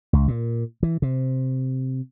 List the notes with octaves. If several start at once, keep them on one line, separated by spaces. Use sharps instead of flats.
C#2
A#2
E3
C3